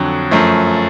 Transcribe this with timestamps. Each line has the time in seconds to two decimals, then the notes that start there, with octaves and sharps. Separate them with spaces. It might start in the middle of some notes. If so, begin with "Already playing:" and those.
Already playing: F2 D3 F#3
0.31 F#2 F3 A3